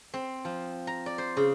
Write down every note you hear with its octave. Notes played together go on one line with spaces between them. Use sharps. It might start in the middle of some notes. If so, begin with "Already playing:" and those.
C4
F3
A#5
D5
C5
C#3